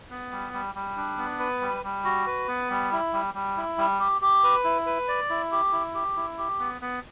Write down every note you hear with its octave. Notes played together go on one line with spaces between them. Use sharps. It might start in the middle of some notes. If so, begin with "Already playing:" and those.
B3
G3
G3
G3
D4
B3
B4
G3
G3
F#4
B4
B3
G3
E4
G3
G3
E4
G3
G4
G4
B4
E4
B4
D5
E4
G4
E4
G4
E4
G4
B3
B3